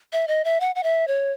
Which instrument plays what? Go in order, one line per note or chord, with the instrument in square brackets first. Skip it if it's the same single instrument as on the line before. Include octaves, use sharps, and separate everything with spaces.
[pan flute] E5
D#5
E5
F#5
F#5
E5
C#5